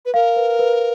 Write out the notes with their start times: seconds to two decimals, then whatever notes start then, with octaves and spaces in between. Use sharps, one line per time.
0.05 B4
0.14 A#4 F5
0.36 B4
0.59 B4